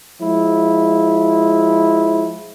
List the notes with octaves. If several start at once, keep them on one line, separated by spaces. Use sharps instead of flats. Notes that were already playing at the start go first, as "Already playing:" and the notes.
F3 G#3 E4